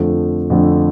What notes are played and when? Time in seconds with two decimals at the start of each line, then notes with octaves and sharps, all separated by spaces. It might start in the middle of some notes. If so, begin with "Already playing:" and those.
Already playing: F2 D3 F3 A3
0.50 F2 D3 F3 A3